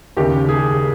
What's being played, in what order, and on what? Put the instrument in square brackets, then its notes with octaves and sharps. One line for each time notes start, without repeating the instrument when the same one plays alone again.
[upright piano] D#2 C#3 G4
G#4